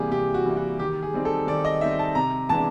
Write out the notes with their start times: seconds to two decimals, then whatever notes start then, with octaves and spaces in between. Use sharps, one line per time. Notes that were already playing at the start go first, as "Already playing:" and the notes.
Already playing: C3 E3 G3 A#3 G4 G#4
0.10 C3 G4
0.34 F#4
0.46 E3 G3 A#3
0.57 F#4
0.79 D#3 G4
1.03 G#4
1.14 G3 C4 D#4
1.25 A4
1.47 D#3 D5
1.65 D#5
1.81 G3 C4 D#4 E5
1.99 A5
2.15 C3 A#5
2.49 E3 G#3 B3 D4 A5